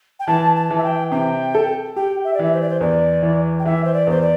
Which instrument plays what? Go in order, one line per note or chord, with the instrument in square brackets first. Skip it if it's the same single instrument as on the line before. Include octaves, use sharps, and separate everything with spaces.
[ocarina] G5
[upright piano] E3 [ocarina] A5
[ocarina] A5
[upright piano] E3
[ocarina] E5
G5
[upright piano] C3 [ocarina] G5
[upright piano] A4
[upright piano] G4 [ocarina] G5
[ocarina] E5
D5
[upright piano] E3 [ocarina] E5
[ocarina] C5
D5
C5
[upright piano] E2 [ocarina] D5
[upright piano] E3
[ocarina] G5
[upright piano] E3 [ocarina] E5
[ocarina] C5
D5
[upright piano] E2 [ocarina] C5
[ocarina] D5